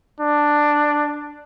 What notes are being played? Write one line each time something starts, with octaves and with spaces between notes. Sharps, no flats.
D4